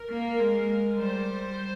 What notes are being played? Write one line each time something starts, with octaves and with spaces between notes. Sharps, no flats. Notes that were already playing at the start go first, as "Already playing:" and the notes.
Already playing: A#4
A#3
G#3
G3 C5